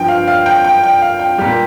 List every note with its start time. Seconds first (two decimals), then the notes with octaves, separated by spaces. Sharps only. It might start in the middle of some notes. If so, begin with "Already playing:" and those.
Already playing: G2 F3 G5
0.08 F5
0.28 F5
0.46 G5
0.64 G5
0.84 G5
1.02 F5
1.19 G5
1.38 A#2 G3 G4